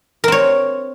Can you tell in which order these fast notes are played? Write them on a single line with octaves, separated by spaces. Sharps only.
A#4 C4 C#5